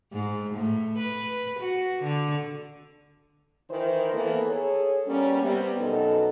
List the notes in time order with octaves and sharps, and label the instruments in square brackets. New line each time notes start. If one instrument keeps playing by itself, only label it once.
[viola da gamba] G#2
A2
B4
F#4
D3
[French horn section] D#3 E3 E4 A#4 C5
E3 A#3 B3 A4
G#4 A4 C#5
G3 A#3 B3 C#4
C3 G3 B3
F#2 B2 D#3 D#4 A4